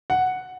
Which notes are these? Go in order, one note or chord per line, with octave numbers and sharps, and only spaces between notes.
F#5